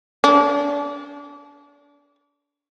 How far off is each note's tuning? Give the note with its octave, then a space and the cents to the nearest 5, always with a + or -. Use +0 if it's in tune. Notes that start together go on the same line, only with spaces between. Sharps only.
D4 -30